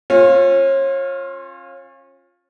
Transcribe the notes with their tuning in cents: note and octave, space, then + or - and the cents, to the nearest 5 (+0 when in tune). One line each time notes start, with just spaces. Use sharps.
C#4 -35 F4 +10